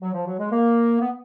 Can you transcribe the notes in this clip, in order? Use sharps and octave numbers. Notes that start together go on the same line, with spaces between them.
F#3
F3
F#3
G#3
A#3
B3